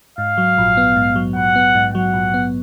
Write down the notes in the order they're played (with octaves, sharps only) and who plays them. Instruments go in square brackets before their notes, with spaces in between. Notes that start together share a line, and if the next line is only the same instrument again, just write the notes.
[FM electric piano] G#2 [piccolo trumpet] F5
[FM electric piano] F#3
A#1
B3
G#2
F#3
[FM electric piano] A#1 [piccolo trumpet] F#5
[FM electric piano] B3
G#2
[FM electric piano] F#3 [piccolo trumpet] F#5
[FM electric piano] A#1
B3